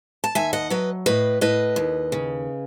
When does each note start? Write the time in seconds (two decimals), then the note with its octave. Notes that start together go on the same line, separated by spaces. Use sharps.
0.24 A5
0.35 D#2 E5 G#5
0.53 D#5 F#5
0.70 F#3 B4 D#5
1.06 A2 B4 D#5
1.41 A2 B4 D#5
1.76 D#2
2.12 C#3